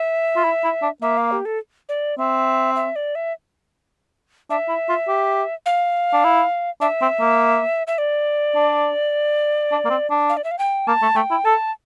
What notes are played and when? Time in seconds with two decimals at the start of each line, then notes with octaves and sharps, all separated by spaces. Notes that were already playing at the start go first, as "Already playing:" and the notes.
Already playing: E5
0.36 F4
0.44 E4
0.64 E4
0.82 D4
1.02 A#3 E5
1.17 F5
1.32 G4
1.45 A4
1.89 D5
2.18 C4 E5
2.76 E5
2.96 D5
3.15 E5
4.50 D4 E5
4.69 E4
4.89 F4
5.08 G4
5.66 F5
6.13 D4
6.24 E4
6.81 D4 E5
7.02 C4
7.21 A#3
7.87 E5
7.98 D5
8.55 D4
9.72 D4
9.85 A#3
9.90 C4
10.10 D4
10.29 F5
10.37 D5
10.44 E5
10.51 F5
10.59 G5
10.87 A#3 A5
11.02 A3
11.16 A3 G5
11.31 E4
11.45 A4 A5